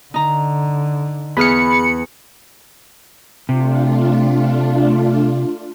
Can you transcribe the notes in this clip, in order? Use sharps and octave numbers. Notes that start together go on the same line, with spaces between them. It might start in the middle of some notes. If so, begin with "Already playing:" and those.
D3 D#4 A#5
E2 G#4 B5 F6 C#7
C3 A3 D4 F4